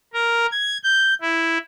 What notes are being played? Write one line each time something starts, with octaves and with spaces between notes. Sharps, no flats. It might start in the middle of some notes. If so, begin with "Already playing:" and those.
A#4
G#6
G6
E4